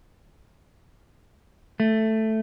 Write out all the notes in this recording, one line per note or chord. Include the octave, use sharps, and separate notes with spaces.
A3